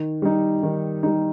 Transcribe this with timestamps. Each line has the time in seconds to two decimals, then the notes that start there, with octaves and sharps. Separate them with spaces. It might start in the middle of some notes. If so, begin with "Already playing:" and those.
Already playing: D#3
0.22 G3 D#4
0.63 D#3
1.03 G3 D#4